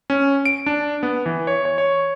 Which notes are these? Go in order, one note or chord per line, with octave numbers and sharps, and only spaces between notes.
C#4
D7
D4
B3
E3
C#5
C#5
C#5